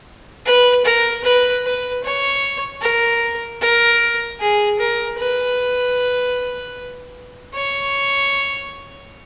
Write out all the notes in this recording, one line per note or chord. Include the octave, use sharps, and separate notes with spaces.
B4
A#4
B4
B4
C#5
A#4
A#4
G#4
A#4
B4
C#5